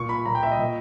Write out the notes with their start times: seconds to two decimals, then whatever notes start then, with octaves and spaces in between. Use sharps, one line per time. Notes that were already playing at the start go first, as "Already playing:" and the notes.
Already playing: A#2 C#6
0.09 B5
0.25 A#2 A#5
0.35 G5
0.43 E5
0.52 D#5
0.59 A#2